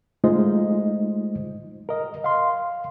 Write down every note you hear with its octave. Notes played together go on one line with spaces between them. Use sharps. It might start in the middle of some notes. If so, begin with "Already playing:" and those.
G#3 A3 D#4 F4 C5 D#5
A#4 D#5
F5 C6